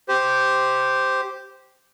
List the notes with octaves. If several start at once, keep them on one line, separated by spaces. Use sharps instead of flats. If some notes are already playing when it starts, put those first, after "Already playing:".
G4 C5